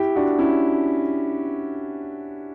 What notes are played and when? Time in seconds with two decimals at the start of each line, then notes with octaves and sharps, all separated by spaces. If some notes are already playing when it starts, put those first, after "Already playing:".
Already playing: E4 G4
0.16 D4 F#4
0.39 C#4 E4